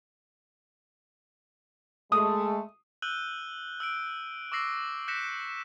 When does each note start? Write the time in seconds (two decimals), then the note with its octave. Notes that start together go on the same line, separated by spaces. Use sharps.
2.12 G#3 A3 D#6
3.02 E6 F#6 G6 D#7 F#7 G7
3.80 E6 F#6 D7
4.52 C#6 D6 E6 A#6 C7 F#7
5.08 F#6 G6 A#6 B6 C#7 E7